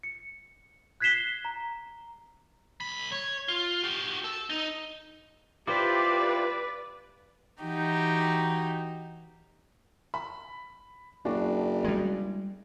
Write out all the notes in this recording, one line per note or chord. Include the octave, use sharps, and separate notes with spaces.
C#7
F#6 G#6 B6 C7 E7 G7
A#5
C2 B5
C#5
F4
F#4 G4
A4
D#4
E4 F4 G4 B4 C5 D5 D6 B6
E3 D#4 F#4 G4
B5
F#1 D4 F#4
G3 G#3